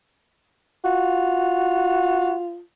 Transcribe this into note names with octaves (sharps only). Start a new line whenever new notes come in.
F4 F#4